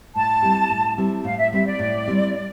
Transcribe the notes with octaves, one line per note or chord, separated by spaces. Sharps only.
A2 A5
G3 C4 E4 G4
A2
G3 C4 E4 G4
A2 F5
E5
G3 C4 E4 G4 E5
D5
A2
G3 C4 E4 G4